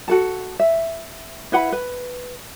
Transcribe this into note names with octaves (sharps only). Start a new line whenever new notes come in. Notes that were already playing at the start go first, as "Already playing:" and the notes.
F#4 A4 A5
E5
E4 B4 F#5 B5
B4